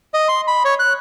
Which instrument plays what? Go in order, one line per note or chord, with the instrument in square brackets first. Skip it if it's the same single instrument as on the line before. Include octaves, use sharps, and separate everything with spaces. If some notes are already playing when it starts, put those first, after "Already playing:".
[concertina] D#5
C6
B5
C#5
F#6